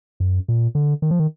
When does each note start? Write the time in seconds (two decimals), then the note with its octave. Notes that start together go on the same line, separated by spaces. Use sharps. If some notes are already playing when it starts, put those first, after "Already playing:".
0.20 F#2
0.48 A#2
0.75 D3
1.02 D#3
1.11 F3
1.19 D#3